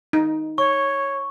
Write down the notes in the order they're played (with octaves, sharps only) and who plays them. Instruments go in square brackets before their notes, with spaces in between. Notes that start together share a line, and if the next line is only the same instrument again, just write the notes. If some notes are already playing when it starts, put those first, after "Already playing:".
[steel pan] D#4
[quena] C#5 [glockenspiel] C#6